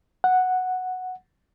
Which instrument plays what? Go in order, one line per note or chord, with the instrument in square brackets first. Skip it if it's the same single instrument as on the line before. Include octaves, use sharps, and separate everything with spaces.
[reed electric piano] F#5